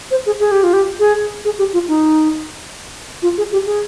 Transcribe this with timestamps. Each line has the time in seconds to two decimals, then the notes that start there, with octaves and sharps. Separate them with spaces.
0.11 C5
0.26 G#4
0.40 G#4
0.51 G4
0.63 F4
0.73 G4
1.00 G#4
1.45 G#4
1.58 G4
1.73 F4
1.88 D#4
3.22 F4
3.38 G#4
3.52 G4
3.66 G#4